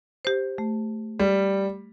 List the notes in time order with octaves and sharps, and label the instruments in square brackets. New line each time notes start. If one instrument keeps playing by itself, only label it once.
[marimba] G4 C5
A3
[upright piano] G3